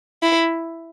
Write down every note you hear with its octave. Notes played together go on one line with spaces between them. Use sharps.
E4